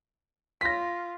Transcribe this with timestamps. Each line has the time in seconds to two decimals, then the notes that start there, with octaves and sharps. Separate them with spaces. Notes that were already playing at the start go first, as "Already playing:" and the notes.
0.61 F4 A#6 B6